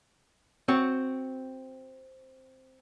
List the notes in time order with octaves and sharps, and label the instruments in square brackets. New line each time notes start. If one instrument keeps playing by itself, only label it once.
[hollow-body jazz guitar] C4 F#4 C#5